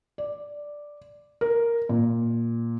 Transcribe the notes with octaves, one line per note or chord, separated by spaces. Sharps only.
D5
A#4
A#2